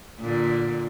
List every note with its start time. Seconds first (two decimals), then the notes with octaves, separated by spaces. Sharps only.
0.20 A#2 D3